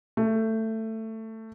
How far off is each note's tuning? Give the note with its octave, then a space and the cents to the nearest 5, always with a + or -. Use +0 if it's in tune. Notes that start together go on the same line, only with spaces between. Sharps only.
A3 +15